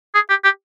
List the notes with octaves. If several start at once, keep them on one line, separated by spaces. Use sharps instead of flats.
G#4
G4
G4